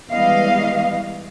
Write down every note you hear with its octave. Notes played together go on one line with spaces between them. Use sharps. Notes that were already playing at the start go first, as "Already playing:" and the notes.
E3 G3 G#3 B3 D#5 F5